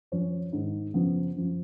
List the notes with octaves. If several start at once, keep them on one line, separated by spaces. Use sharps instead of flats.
F#2 F3 C#4
G#2 D#3
F#2 C#3 F3 B3
F#2 F3